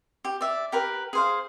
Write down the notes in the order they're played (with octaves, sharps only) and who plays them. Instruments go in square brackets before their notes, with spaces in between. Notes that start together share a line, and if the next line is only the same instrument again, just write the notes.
[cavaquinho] G4
D5 E5
G4 A#4 B4
G#4 C5 F5